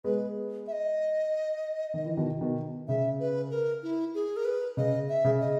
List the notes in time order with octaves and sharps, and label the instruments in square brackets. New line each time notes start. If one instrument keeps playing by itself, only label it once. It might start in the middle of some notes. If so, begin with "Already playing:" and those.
[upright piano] G#3 B3 [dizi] B4
[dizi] E5
D#5
[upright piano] D#3
E3
B2 D#3
B2 D#3
[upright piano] C#3 [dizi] E5
[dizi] B4
A#4
E4
G#4
A#4
B4
[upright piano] C#3 [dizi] D#5
[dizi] E5
[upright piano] C#3
[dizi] D#5